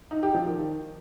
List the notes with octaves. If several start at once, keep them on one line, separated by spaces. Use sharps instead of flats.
D#4
G4
F3
D#3